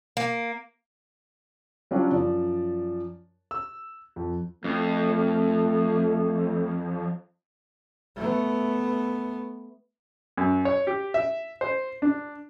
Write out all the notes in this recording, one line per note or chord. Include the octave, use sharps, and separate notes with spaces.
A#3
F#3 G3 C#4 D4 F4 F#4
F#2 F3 D5
E6
F2
F2 A3
A3 B3
F#2
C#5
G4
E5
C5
D4